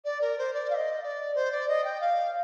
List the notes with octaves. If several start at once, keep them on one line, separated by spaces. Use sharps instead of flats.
D5
A#4
C5
D5
F5
D#5
D5
C5
D5
D#5
G5
F5